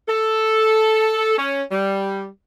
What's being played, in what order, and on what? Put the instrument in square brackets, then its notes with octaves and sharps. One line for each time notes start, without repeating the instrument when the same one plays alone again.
[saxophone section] A4
C#4
G3